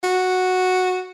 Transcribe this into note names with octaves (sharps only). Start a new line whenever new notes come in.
F#4